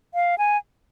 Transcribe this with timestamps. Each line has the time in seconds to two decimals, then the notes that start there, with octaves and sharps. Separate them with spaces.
0.14 F5
0.38 G#5